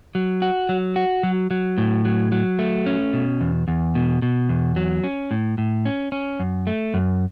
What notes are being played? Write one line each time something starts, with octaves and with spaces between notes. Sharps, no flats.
F#3
F#4
F#3
F#4
F#3
F#3
A2
F#3
F#3
A3
C#4
B2
E2
E2
B2
B2
E2
F#3
C#4
A2
A2
C#4
C#4
F#2
A3
F#2